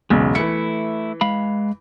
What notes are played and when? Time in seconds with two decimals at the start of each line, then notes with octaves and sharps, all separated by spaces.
0.10 E1 B1 C#3 G#3
0.35 E3 A3 E4 C#7
1.21 G#3 F5 B5